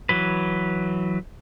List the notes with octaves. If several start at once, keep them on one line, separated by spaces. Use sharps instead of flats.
E3 F#3 B4